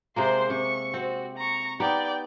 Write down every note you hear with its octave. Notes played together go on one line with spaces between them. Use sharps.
C3 G#3 A#3 C5 C6
C3 C#6
C4 F#4
A#5 C#6
B3 D#4 G4 D5 G5